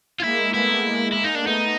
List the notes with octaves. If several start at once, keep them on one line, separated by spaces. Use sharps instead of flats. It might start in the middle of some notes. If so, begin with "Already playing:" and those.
F4
G#3 A#3 E4
A3 B3 E4
G#3 A#3
G#3 A#3 E4
D#4
D4
A3 B3
D#4